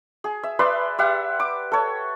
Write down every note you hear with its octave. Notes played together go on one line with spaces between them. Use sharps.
G#4
E5
B4 D5 E5 C6
G4 E5 F#5
D6
A4 C#5